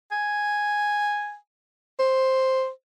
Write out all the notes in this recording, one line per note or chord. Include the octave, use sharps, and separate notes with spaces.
G#5
C5